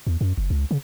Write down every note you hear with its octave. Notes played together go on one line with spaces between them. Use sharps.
E2
F#2
F#1
C#2
C#3